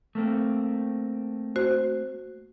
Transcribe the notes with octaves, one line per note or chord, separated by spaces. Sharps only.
A3 A#3 C4
F#4 C5